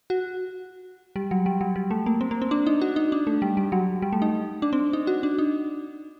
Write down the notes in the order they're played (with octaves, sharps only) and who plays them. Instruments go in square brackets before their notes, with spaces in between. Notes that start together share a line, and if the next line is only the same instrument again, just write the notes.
[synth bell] F#4
G3
F#3
G3
F#3
G3
A3
A#3
C4
A#3
C4
D4
D#4
F#4
D#4
D4
A3
G3
G3
F#3
G3
A3
D#4
D4
C4
D#4
F#4
D4
D#4